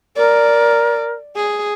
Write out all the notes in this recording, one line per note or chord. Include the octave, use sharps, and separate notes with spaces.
A#4 D5
G#4